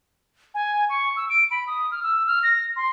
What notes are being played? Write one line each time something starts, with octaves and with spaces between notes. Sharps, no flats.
G#5
C#6
E6
D7
B5
D#6
F6
E6
F6
A#6
C6